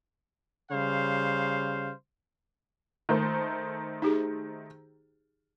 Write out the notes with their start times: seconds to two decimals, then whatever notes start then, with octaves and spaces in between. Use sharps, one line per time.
0.71 C#3 G3 C5 F5
3.09 D#3 A3 C5
4.02 D#4 G4 G#4